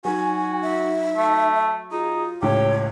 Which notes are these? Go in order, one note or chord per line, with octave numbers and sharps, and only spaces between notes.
F#3 D#4 F#4 G#5
E5
A3
D#4 F4 G#4
C#2 A2 G4 C#5